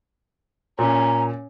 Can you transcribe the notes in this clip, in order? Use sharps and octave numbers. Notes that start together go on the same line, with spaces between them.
A#2 C#4 A#5